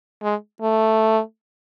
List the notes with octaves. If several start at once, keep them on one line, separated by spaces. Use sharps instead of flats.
G#3
A3